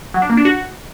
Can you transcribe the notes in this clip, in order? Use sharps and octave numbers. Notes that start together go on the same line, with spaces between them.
F#3
D4
A#3
D4
F#4